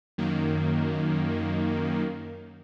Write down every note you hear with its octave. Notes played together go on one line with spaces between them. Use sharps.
F#2 D#3 A#3